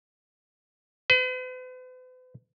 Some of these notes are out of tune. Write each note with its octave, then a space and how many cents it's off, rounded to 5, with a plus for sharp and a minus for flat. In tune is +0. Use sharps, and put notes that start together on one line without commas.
B4 +45